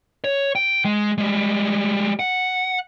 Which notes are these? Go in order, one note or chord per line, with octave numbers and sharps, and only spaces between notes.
C#5
G5
G#3
G3 G#3
F#5